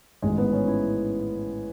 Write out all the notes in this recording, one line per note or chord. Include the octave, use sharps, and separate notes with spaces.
A1 G#2 D#3 G#3
B3
C#4
E4